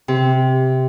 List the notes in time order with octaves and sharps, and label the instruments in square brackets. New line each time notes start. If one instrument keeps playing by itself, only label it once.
[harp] C3